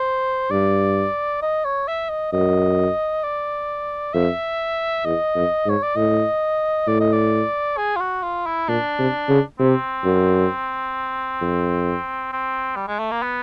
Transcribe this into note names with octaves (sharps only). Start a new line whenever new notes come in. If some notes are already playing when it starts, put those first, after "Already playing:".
Already playing: C5
G2 D5
D#5
C#5
E5
D#5
F#2 D#5
D5
F2 E5
E2 D#5
F2
G#2 C#5
D5
A2 D#5
A2 D5
D#5
D5
G#4
F4
F#4
F4
E4
A#2 D4
C3
C#3
C3 C4
F#2
F2
C4
G3
G#3
A3
A#3
B3